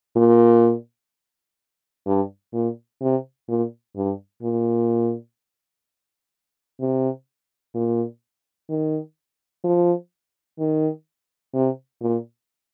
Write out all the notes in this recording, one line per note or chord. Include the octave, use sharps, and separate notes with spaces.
A#2
G2
A#2
C3
A#2
G2
A#2
C3
A#2
D#3
F3
D#3
C3
A#2